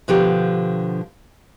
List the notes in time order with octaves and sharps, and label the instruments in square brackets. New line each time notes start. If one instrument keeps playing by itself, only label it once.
[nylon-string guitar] B2 D3 F3 G4